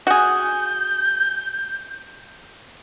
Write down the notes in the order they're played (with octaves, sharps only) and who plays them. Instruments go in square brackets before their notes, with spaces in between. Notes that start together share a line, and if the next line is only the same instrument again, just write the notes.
[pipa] F#4 G#4 [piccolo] G6